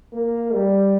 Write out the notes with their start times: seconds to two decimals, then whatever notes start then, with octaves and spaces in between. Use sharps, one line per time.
0.13 A#3
0.53 G3